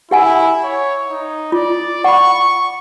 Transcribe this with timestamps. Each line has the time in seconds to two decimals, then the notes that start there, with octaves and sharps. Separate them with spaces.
0.11 E4 G4 F#5 G#5
0.64 C#5
1.09 D#4
1.52 F4 D5
2.04 F#5 B5 C#6